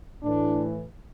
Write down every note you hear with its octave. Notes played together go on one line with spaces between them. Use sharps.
A2 E3 D4